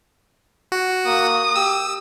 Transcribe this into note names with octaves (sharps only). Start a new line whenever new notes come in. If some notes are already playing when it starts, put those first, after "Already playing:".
F#4
A#3 D#6
G4 E6